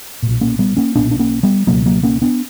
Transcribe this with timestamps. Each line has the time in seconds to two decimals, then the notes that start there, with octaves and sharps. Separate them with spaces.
0.23 B1 A#2
0.41 A#3 C#4
0.59 G3 B3
0.77 A#3 C#4
0.95 B1 A#2 B3 D4
1.11 D4
1.19 A#3 C#4
1.43 G3 B3
1.67 C#2 B2 F#3 A#3
1.86 F#3 A#3
2.03 A#3 C#4
2.22 B3 D4